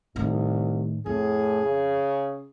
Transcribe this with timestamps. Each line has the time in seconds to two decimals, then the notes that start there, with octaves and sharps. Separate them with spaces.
0.16 C2 A2 D#3
1.06 F2 A2 G#4
1.62 C#3